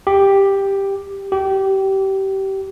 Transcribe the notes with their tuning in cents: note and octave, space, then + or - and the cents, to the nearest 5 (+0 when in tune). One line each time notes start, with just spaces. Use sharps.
G4 +5
G4 -25